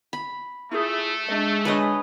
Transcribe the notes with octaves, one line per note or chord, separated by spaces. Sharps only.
B5
A3 E4 F4 G#4
G#3 D4 D#5
D4 B4 C#5 D#5 G#5